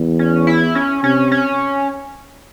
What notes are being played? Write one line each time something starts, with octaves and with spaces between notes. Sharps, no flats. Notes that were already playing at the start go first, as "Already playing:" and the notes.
Already playing: E2
C#4
E4
C#4
C3 C#4
C#4